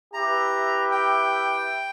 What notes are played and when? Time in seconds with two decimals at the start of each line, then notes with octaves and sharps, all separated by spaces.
0.13 E4 G4 B4 E5 A#5
0.91 G5